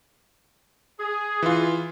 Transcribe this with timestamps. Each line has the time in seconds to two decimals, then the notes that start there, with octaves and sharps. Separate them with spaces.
0.99 G#4
1.43 E3 F4